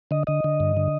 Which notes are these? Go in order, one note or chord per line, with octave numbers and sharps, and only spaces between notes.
D3 D#5
D3 D#5
D3
G2
D3